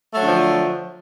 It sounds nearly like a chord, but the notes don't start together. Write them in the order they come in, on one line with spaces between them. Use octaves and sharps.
A3 F#3 D3 F3